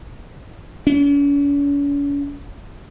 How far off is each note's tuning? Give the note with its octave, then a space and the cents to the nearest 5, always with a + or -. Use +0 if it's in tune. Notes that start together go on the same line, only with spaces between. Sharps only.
C#4 +45